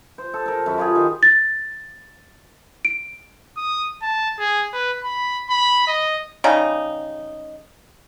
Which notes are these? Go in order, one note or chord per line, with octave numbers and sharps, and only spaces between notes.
C5
A4
A4 A#4
F#2 B5
F4 G4 G#4
D#3 G#4
A6
D7
D#6
A5
G#4
B4
B5
B5
D#5
C#3 G3 D#4